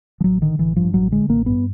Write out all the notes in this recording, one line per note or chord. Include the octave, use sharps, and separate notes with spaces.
F3
A1 F#3
D3 D#3
A1 E3
G2 F3
A1 F#3
D3 G#3
A1 A#3
G2 B3